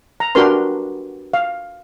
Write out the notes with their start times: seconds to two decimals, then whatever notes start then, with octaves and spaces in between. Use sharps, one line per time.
0.20 A#5
0.35 D4 F#4 G4 A#4 B4 C6
1.34 F5